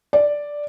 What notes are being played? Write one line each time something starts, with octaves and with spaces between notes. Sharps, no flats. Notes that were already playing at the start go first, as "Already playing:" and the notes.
D5